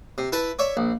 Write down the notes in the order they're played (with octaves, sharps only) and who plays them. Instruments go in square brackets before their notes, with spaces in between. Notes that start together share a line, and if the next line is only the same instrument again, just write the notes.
[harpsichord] C3
E4 B4 A5 B5
C#5 D5 E5
A#1